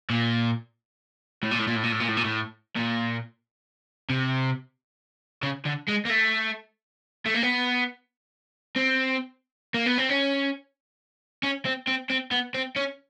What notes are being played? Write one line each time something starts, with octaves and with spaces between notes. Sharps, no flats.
A#2
A2
A#2
A2
A#2
A2
A#2
A2
A#2
A2
A#2
A2
A#2
C3
C#3
D3
G#3
A#3
A3
A3
A#3
B3
C4
A#3
B3
C4
C#4
C#4
C4
C4
C4
B3
C4
C#4